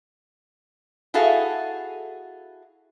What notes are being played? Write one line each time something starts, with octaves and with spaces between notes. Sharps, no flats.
E4 F#4 G#4 A4 F5